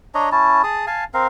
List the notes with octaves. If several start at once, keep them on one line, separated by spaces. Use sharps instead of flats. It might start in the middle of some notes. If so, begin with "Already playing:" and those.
D4 C#5 D#5 A#5
C#4 E4 A5
G#4 A5 D#6
F5 G#5 A5
C4 A#4 F5